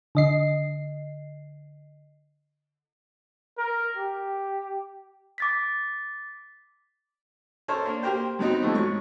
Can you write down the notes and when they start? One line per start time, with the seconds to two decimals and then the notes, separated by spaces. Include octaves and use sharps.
0.15 D3 D#5 C7
3.58 A#4
3.97 G4
5.38 D6 A6 B6
7.68 C#4 A4 A#4 C5 C#5 A5
7.85 A#3 D4
8.03 A#3 G4 A#4 C5 G5
8.39 F#2 B3 C4 D#4 F#4
8.62 E3 F3 G3 A3 B3
8.74 G#2 B2 F#3 C#6